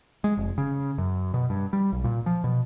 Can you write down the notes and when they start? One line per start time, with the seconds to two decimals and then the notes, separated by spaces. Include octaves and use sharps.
0.24 G#3
0.37 F1
0.58 C#3
0.98 F#2
1.34 B2
1.50 G2
1.73 G3
1.92 B1
2.04 A#2
2.26 F3
2.44 B2